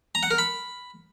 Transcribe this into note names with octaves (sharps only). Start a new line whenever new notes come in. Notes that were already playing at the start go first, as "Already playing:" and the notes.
A#5
F#5
A#4
B5